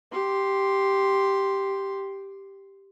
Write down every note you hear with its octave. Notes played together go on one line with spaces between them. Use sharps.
G4 C6